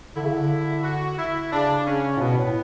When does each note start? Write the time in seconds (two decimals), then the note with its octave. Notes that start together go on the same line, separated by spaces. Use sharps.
0.16 D3 E4
0.25 C#3
0.34 D3
0.84 F#4
1.18 E4
1.52 C#3 D4
1.86 C#3 C#4
2.17 A2
2.20 B2 B3
2.37 A2